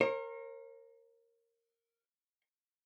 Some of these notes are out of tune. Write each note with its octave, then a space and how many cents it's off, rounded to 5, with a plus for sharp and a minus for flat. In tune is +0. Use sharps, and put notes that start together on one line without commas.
A#4 -10 C#5 -45